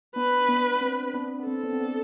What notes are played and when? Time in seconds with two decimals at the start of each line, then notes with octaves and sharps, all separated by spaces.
0.16 B3 D4 B4
0.49 B3 D4
0.76 D4
0.81 C4
1.14 B3 D4
1.40 B3
1.47 C4 A4
1.63 B3 D4
1.73 C4
1.80 B3 D4